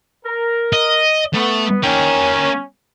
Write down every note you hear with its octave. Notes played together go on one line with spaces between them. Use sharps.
A#4
D#5
A3 B3
A#3 C#4 G5